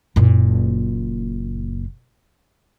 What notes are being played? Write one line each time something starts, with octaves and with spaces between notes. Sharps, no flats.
F#1 A#2